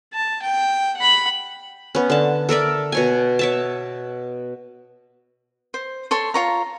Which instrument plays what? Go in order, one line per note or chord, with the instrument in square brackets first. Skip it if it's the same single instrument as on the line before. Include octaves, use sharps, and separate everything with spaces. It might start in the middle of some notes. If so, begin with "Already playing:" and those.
[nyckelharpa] A5
G5
F#5 B5
[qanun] B3 C#4
D3 A5
A4 A#4 D5 E5
B2 C#5 G#5
C#5 E5 A5
[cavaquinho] C5
A4 C#5 C6
F4 C#5 A#5